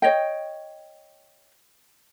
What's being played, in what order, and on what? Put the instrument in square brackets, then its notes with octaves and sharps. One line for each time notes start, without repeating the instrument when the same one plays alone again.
[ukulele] C#5 D#5 G5